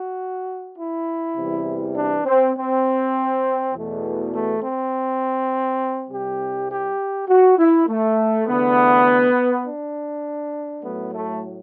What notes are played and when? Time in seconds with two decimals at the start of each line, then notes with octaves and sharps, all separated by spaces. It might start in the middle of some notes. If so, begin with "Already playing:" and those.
Already playing: F#4
0.77 E4
1.36 E2 C3 E3 G3
1.95 D4
2.24 C4
2.55 C4
3.73 E2 B2 A3
4.32 A3
4.61 C4
6.09 C2 C3 G3 G4
6.69 G4
7.27 F#4
7.57 E4
7.86 A3
8.46 E2 D3 A3 B3
9.63 D4
10.82 A2 F#3 A3 B3
11.11 A3